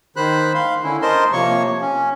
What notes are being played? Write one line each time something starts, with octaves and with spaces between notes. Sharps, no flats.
D#3 C5 B5 F#6
F5 C6
D3 C#4 E4
A#4 C5 D#5 A5 C6
C3 F3 A#3 C#5 C#6
C#4